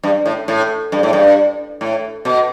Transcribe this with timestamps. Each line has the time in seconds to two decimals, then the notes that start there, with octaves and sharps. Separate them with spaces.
0.03 G2
0.26 A2
0.48 A2
0.92 G2
1.03 A2
1.13 G2
1.81 A2
2.25 B2